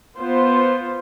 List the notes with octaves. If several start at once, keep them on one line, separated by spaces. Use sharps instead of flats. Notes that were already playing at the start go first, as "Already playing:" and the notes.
B3 F4 C5